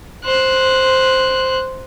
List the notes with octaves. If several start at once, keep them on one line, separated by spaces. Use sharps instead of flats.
C5 F#6